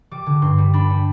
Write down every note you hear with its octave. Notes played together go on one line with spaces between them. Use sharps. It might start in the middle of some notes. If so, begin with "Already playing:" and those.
G3 D6
D3
G2 C6
G3
D4 B5
G3